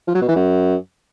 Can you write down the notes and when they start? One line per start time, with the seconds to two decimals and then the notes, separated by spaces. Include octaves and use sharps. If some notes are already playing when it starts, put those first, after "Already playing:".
0.08 F3
0.15 F#3
0.22 B2
0.29 E3
0.36 F#2